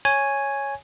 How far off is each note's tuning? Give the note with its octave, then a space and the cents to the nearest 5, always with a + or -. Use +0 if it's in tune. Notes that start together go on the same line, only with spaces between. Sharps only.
C#5 +0 G#5 +0